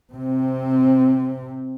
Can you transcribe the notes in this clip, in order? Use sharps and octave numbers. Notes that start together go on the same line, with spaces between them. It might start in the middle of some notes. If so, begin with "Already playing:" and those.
C3 C4